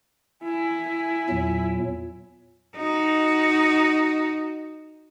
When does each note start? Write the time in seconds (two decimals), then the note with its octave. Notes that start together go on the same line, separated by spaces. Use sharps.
0.43 E4 G#5
1.30 E2 A#2 F#3
2.76 D#4 F#4